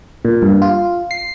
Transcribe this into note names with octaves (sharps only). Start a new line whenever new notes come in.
A#2
G2
F4
C7